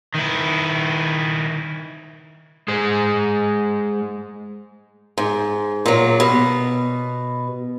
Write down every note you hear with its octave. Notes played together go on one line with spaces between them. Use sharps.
D#3 E4
G#3 G#4 C5
G#2
A#2 F#3
B2